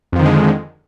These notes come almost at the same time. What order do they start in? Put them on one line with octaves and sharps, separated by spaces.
F2 F3 D#3 D3 G#3